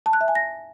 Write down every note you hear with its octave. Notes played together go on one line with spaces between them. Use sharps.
A5
F#6
E5
G#5
A#6